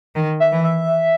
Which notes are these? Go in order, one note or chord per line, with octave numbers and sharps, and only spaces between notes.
D#3
E5
E3
E5